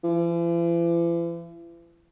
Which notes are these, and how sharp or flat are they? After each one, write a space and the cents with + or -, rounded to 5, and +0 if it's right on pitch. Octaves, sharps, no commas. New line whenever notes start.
E3 +45